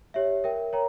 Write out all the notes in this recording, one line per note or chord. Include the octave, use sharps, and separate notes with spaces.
G4 C#5 E5
A#4 E5 G5
A#4 C#5 G5 A#5